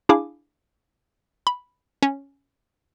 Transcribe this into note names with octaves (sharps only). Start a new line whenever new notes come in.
D4 E4 G#4 F5 G#5 D6
B5
C#4